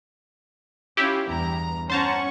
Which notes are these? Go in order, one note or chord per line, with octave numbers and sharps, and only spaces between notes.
C#4 E4 F4 G4
E2 G2 A#5
C#4 C5 F#5 A5 A#5 C#6